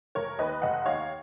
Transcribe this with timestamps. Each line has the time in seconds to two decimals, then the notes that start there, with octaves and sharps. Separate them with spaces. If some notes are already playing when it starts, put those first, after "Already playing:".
0.15 F1 A#4 C#5
0.39 D#2 B4 D#5
0.62 F1 D#5 F#5
0.86 D#2 C#5 F5